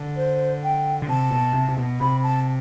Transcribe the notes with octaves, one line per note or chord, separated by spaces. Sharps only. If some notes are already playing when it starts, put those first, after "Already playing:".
Already playing: D3
C5
G5
D3
C3 A5
B2
C3
C3
B2
C3 B5
A5